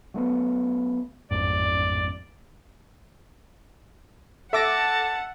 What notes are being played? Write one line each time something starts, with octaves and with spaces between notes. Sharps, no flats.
F#3 A3 B3
A1 F2 G#2 D5
A4 E5 F#5 A5 D6 A#6